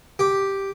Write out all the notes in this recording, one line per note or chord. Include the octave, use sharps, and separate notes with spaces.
G4